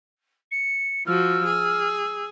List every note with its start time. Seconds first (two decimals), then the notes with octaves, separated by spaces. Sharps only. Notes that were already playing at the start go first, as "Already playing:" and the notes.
0.51 C#7
1.07 F3 F#4 E6 F6
1.45 G#4